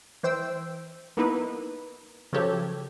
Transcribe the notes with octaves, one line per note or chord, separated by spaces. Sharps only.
E3 C5 G5 E6
A#3 B3 D#4 E4 B4
C#3 F3 F#3 G4 A4 C#5